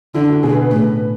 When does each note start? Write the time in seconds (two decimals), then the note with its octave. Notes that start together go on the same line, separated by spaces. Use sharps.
0.14 D3 E4
0.29 F#4
0.43 B2 G#4
0.52 B4
0.62 B4
0.71 A2